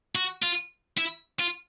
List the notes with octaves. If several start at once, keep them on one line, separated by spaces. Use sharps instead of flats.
F#4
F4
E4
F4